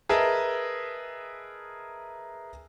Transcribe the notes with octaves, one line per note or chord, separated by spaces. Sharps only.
G#4 A#4 B4 D#5 E5 A5